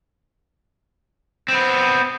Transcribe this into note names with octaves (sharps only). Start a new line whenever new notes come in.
B3 C4